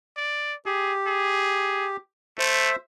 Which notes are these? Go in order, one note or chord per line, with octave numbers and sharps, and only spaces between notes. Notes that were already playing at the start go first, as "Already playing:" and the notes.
D5
G4 G#4
G#4
A3 C5 E5